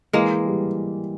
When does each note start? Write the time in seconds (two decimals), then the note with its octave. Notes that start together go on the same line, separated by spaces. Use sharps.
0.13 E3 G#3 A#3
0.46 G3